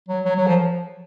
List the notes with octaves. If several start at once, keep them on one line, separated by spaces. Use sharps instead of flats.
F#3
F#3
F#3
F3